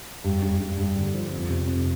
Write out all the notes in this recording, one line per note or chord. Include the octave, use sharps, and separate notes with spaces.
G2
G2
G2
G2
D3
F3
F2
C3
F2